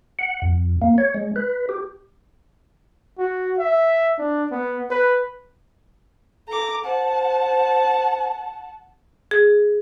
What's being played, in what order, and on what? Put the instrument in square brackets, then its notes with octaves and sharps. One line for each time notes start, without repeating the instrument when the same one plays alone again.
[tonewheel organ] F#5
F2
A#3
C#5
G#3
B4
G4
[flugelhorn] F#4
E5
D4
B3
B4
[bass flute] A4 [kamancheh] A#5 D6
[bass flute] C5 [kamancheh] F#5 A5
[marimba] G#4